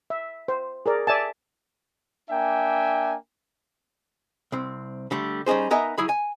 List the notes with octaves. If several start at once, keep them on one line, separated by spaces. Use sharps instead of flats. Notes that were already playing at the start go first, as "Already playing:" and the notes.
E5
C5
G#4 A#4 D5
D5 E5 G#5 A5
A#3 D4 E5 G5 G#5
C2 C4
D3 G3 A3
G3 C#4 D#4 G#4 C5
B3 D#4 A#4 D#5 E5 G#5
F#3 E4 G#4 B5
G#5